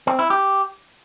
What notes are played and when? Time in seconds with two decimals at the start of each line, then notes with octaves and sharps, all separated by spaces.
0.07 C4
0.19 E4
0.30 G4